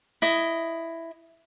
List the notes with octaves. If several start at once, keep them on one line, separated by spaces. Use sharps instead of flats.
E4 D#5